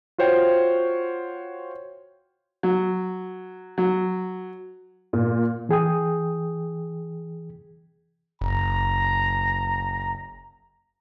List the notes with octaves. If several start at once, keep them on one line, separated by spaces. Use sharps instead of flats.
F4 F#4 C5 C#5 G5
F#3
F#3
A#2
E3 G#4 G5 D#6
F#1 A#5